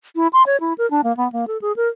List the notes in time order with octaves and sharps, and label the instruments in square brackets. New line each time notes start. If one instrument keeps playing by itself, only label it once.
[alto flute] E4
C6
C#5
E4
A#4
D4
A#3
B3
A#3
A4
G#4
A#4